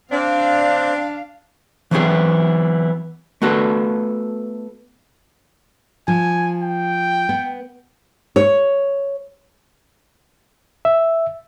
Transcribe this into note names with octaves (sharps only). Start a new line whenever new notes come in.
C4 D4 F5
E3 F#3 B3 C4 E4 G#4
A3 B3 F#4 A4 B4
F3 G#5
G5
B3
C#5
E5